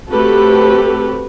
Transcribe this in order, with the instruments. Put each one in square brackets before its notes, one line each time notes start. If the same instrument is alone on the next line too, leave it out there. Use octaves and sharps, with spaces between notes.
[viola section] A3 C4 F#4 G4 A4 B4